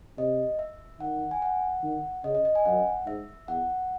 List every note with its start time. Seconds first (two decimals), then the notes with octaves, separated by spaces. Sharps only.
0.18 C3 D#5
0.59 E5
1.00 D#3 F#5
1.31 G#5
1.42 F#5
1.83 D#3
2.24 C#3 D#5
2.35 D#5
2.45 D#5
2.55 G#5
2.65 F#2 F#5
3.07 G#2 E5
3.48 E2 F#5